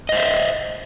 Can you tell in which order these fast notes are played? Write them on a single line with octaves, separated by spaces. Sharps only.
D#5 C5 E5